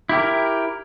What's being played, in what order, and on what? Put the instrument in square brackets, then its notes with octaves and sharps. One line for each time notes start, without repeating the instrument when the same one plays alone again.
[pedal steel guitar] E4 G4 A#4